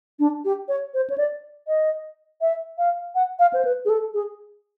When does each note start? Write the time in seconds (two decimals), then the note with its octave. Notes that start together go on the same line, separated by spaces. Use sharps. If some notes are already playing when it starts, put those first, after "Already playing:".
0.19 D4
0.45 G4
0.68 C#5
0.94 C5
1.10 C#5
1.18 D5
1.68 D#5
2.41 E5
2.78 F5
3.15 F#5
3.39 F5
3.53 C5
3.65 B4
3.85 G#4
3.89 A4
4.14 G#4